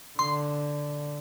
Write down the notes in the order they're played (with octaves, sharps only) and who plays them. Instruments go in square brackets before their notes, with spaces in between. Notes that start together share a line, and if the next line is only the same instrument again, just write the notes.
[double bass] D3 [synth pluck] C6